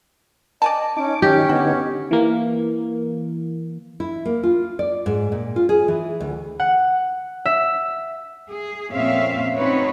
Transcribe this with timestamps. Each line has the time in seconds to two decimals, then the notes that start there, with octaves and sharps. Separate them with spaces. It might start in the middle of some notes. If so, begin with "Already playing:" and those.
0.62 D5 D#5 G#5 A5
0.97 C#4 D#4 D6
1.22 D#3 C#4 D#4 G4
1.49 D3 B3 D#4 F#4
2.11 E3 A#3
4.00 E4
4.25 A#3
4.43 F4
4.79 D5
5.06 G#2
5.32 A#2
5.56 F4
5.69 G#4
5.88 E3
6.20 D2
6.60 F#5
7.45 E5
8.49 G#4
8.92 F2 A#2 C4 C#4 E5 F5
9.56 C4 C#4 D#4 F#4 B4 C#5